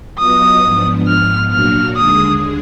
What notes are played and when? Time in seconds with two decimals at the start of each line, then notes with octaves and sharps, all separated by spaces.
0.18 F#3 B3 F4 B4 D#5 D#6
0.62 G#2 F3 B3 D4
1.07 G#2 F3 B3 F6
1.51 A#2 F#3 A#3 D4 F#4 F6
1.96 D#2 D3 G#3 D4 G#4 D#6